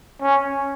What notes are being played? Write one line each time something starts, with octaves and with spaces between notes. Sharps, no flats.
C#4